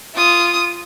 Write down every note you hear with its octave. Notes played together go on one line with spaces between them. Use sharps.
F4 D#6